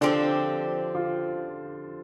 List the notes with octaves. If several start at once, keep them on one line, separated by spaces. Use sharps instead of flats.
D3 F3 C4 D4 G4
F4